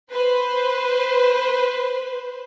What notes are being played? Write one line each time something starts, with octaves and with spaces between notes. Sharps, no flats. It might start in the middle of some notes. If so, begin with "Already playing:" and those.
B4 C5